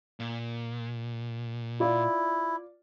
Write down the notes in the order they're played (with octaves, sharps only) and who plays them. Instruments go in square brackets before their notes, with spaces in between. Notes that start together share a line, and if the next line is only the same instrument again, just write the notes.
[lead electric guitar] A#2
[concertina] E4 [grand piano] F4 D5 F5